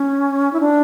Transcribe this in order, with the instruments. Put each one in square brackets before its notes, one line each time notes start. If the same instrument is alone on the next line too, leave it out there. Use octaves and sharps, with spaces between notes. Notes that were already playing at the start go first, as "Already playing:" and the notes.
Already playing: [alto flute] C#4
E4
D4